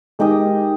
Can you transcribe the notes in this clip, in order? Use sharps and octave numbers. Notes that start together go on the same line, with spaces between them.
G#3 D#4 G4 G#4 A#4 D#5